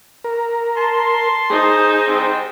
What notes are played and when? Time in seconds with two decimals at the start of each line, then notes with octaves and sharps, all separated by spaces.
0.24 A#4
0.77 A5 C6
1.50 D#4 G#4 C5
2.07 G#2 G3 C4